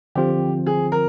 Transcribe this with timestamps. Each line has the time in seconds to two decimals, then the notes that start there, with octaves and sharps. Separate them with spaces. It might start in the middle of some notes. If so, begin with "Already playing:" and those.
0.15 D3 F3 C4 F4 G4
0.66 G#4
0.92 A#4